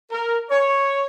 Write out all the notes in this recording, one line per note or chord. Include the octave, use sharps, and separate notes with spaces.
A#4
C#5